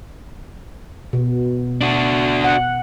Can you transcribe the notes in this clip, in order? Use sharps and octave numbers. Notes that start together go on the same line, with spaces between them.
B2
D4 F#4
F#5